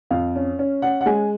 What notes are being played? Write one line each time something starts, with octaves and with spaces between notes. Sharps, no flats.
F2 F5
C#4
C#4
C#4 F#5
F#5
G#3 G#5